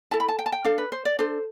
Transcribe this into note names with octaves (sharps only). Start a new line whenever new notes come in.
E4 A4 A5
B5
A5
G5
A5
G5
D4 A4 F5
B4
C5
D5
D4 A4 C5